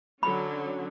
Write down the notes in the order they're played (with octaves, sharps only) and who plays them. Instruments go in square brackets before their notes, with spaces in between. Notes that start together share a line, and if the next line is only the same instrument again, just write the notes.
[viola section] D3 F#3 C#4 [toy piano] B5